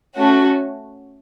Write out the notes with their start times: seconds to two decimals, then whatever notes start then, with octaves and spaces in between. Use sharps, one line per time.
0.15 A3 C#4 F#4